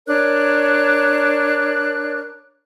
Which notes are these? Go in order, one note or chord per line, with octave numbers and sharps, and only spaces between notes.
D4 A#4 C#5 F#6